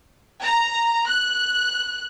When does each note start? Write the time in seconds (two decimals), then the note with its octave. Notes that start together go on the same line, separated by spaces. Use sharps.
0.41 A#5
1.07 F#6